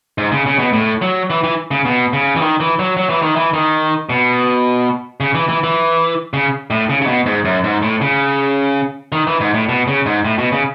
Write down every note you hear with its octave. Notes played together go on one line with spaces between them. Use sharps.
G#2
C#3
C#3
B2
A2
F#3
E3
E3
C#3
B2
C#3
E3
D#3
E3
F#3
F#3
E3
D#3
E3
D#3
B2
C#3
E3
E3
E3
C#3
A2
C#3
C#3
B2
G#2
F#2
G#2
A2
C#3
D#3
E3
G#2
A2
B2
C#3
G#2
A2
B2
C#3